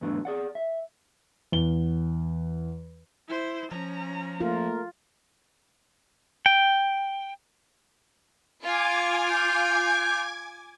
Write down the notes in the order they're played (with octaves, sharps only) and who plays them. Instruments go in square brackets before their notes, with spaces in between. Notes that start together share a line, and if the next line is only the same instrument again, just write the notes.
[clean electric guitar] E2 G#2 F#3 A3 B3 D4
G#4 D5 F#5
E5
[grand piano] E2 G7
[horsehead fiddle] E4 C5
[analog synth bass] F3 [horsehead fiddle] C#4 A#5
[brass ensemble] A3 A#3 A#4 [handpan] F4
[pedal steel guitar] G5
[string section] F4 [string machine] G#5 D6 G#6
[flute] G6